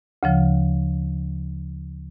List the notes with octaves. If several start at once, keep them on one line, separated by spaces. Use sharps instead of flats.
D2 C#3 F3